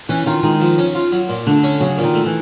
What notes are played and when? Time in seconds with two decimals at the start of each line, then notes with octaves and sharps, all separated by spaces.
0.09 E3 C#4
0.26 D#3 F4
0.43 D#3 G#3
0.61 F3
0.78 C#4
0.95 F4
1.12 F#3
1.29 A#2
1.47 D3 A3
1.63 C#4
1.80 C#3 F#3
1.98 A#2
2.04 D#3
2.15 A3
2.26 E3